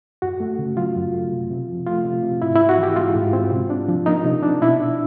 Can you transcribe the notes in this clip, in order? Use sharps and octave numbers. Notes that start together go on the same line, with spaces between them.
F#2 F#4
A3
C#3
F#3 F4
F#2
A3
C3
C3
F3
A3 F4
C3
C3
G#2 E4
C4 E4
F#4
E3 G4
G#3 F4
G#2
C4
C3
D4
F3
A#3 D#4
C3
D4
B2 E4
D4